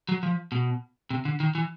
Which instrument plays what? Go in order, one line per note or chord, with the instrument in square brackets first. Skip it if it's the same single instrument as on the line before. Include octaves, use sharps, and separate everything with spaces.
[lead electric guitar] F#3
F3
B2
C3
D3
D#3
E3